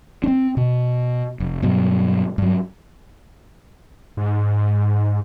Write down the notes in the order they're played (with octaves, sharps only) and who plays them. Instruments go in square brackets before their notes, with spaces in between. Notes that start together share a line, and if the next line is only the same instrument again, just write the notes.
[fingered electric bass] C4 D4
B2
F1
G2 B2 F#3
G2 F#3
[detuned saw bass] G#2